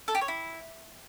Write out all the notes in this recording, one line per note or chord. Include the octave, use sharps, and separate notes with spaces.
A4
G4
C#5
E4